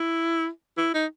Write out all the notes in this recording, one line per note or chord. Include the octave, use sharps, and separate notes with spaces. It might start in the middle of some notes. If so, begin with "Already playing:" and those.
Already playing: E4
E4
D#4